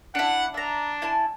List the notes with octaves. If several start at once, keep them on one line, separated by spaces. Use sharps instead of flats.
D4 E4 F#5
D4 E5 A#5
E4 G#5 A5